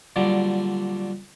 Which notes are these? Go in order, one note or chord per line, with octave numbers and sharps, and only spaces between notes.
A#2 D3 F#3 G3